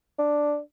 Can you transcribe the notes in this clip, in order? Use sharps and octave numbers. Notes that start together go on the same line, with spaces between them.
D4